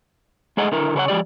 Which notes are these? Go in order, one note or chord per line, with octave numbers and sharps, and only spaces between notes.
G#3 A3 G#4 D#5 F#5
D3 E4 A#4
C#3 F#4 B4 C#5 F#5
F3 G#3 G4 D5